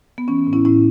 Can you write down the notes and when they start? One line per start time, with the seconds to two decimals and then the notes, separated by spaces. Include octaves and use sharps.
0.18 B3
0.28 E3 C#4
0.47 A2
0.53 C#4 E4
0.65 A2 C#4 E4